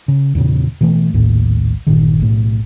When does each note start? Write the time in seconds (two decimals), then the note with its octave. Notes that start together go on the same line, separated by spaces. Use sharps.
0.08 C#3
0.35 E2 A#2 C#3
0.81 B2 E3 A3
1.14 A#1 D#2 A2
1.87 G1 A#2 D#3
2.20 B1 A2